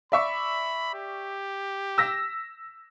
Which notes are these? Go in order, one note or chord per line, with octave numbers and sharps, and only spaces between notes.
D5 E5 B5 C#6
G4
E6 A#6 B6